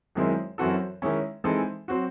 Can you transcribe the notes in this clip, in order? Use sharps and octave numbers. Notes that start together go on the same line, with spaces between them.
F#2 D#3 G#3 C4 E4
F#2 E3 C4 F#4 A4
D#3 G#3 C#4 E4
E3 G#3 C4 D#4 A4
F#3 C4 F#4